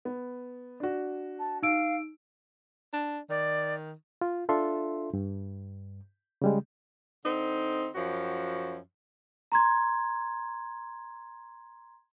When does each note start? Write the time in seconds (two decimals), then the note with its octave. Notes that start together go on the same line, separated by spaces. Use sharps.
0.05 B3
0.80 D4 F#4
1.39 A5
1.63 D#4 F5 E6 D7
2.93 D4
3.30 D#3 D5
4.21 F4
4.49 D4 F4 A4 E5 C6
5.14 G2
6.42 C#3 G3 G#3
7.26 D3 C4 D#4
7.95 F#2 F3 F#4
9.52 A#5 C6 G#6